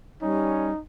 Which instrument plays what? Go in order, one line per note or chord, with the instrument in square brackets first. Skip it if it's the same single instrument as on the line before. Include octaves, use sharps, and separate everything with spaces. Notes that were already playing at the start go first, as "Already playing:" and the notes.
[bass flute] G3 [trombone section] C#4 [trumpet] D#4